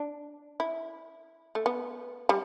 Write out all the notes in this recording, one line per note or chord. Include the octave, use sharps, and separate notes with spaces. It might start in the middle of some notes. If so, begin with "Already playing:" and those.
Already playing: D4
E4
A3
B3
G3